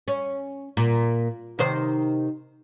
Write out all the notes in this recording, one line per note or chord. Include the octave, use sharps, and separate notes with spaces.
C#4
A#2
C3 D#3 C5